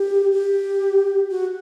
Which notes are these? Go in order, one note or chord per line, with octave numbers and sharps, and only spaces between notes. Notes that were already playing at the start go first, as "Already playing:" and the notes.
Already playing: G4
G4
F#4